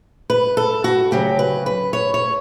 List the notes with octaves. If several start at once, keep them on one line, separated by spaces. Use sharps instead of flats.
B4
A4
F#4
D2 C#3 F#3 G4
B4
B4
C#5
C#5